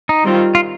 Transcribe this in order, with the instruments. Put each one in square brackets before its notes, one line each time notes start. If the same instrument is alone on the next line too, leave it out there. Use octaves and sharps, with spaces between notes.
[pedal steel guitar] D#4
[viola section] D#3 G3 C4 F4
[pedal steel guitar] F4